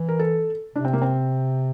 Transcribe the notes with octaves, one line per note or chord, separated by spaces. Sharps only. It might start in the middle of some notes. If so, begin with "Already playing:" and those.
Already playing: E3
A#4
A4
C3 D4
C4
A#3
C4